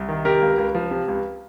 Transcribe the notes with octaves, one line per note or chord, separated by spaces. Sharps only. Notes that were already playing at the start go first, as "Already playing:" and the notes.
Already playing: C2
D#3
C3 G4 A#4
C#2
C#2
F3
C3
C#2